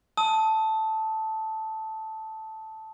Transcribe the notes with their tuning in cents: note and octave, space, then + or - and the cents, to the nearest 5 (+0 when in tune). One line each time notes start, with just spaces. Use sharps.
A5 +0 D#6 +35